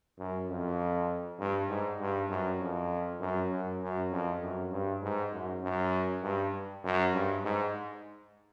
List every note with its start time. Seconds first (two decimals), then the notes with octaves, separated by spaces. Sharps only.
0.19 F#2
0.49 F2
1.39 G2
1.69 G#2
2.00 G2
2.30 F#2
2.61 F2
3.21 F#2
3.51 F#2
3.82 F#2
4.12 F2
4.42 F#2
4.73 G2
5.02 G#2
5.33 F#2
5.64 F#2
6.23 G2
6.84 F#2
7.14 G2
7.44 G#2